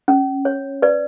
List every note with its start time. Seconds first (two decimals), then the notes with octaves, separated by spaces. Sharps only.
0.08 C#4
0.45 C#5
0.82 B4 D5